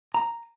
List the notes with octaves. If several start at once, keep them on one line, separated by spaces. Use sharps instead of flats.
A#5